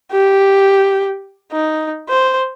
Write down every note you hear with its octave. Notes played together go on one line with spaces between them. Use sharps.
G4
D#4
C5